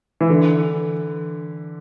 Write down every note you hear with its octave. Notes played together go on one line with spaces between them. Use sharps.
E3
D3